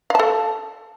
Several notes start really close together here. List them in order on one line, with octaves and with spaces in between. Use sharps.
F5 A5 A4